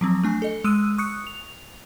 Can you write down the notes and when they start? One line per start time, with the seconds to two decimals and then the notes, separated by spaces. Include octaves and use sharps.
0.01 F3 F#3 C4
0.24 A3 D4 G#5
0.42 A4 D#5
0.64 G#3 D#6 E6 D#7
0.98 C#6 D#6 F#6 C#7
1.27 F7